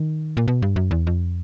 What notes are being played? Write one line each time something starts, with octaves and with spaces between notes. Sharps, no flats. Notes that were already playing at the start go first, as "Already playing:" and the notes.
Already playing: D#3
A#2
B2
G2
F#2
E2
F2